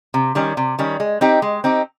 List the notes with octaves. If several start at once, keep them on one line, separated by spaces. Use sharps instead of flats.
C3
D#3 G3 C#4
C3
D#3 G3 C#4
G#3
C4 D#4 G4
G#3
C4 D#4 G4